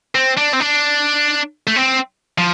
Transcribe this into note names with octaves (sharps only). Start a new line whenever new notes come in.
C4
D4
C4
D4
A3
C4
F3